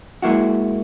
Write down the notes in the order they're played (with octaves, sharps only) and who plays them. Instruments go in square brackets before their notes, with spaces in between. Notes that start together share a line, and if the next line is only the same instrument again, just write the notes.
[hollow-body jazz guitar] G#3 A#3 E4 F#4